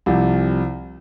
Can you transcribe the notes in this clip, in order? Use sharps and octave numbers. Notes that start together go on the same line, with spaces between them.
C2 C3 F3